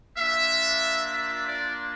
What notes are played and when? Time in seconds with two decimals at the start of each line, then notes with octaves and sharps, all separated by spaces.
0.17 A#3 D4 F4 E5
1.11 E5
1.44 D5